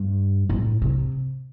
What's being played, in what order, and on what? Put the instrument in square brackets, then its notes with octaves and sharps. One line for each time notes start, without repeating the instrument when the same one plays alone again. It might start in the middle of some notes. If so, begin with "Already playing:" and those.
Already playing: [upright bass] G2
A2
C3